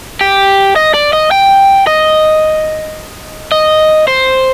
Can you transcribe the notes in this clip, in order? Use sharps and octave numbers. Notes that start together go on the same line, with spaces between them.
G4
D#5
D5
D#5
G5
D#5
D#5
C5